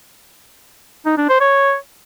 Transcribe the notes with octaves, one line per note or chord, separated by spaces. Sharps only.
D#4
D4
C5
C#5